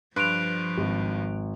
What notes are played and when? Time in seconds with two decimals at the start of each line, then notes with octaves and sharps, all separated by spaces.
0.16 G2 F3 B4 C6 F#6 D7 F7
0.78 G#1